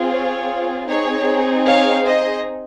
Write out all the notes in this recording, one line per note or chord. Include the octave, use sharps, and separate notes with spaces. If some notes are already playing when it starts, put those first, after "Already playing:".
Already playing: C4 F4 G#4
C#5
C4 D#4 G#4 C#5
C#5 F5
C5 D#5